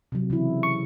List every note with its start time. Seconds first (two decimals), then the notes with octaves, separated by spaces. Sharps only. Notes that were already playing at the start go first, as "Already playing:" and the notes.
0.12 C3 F#3
0.30 C#3 E3 E4
0.63 C#6